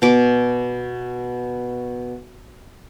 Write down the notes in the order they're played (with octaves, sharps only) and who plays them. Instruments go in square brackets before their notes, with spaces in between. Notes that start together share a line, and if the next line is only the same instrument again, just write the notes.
[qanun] B2 D6